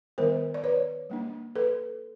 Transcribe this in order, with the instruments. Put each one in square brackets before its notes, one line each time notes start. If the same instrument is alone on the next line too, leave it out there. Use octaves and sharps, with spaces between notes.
[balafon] D#3 G3 B3 A#4 C5
D5
B4 C#5
G3 A#3 D4
A4 B4